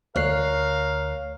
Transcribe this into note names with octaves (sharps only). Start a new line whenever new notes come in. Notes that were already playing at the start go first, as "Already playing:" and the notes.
D2 A#4 C#5 F5 F#6 C7